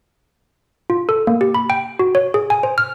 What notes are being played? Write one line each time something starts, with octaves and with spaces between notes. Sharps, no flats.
F4
A4
A#3
G4
B5
G5
F#4
C#5
G#4
G#5
C5
F6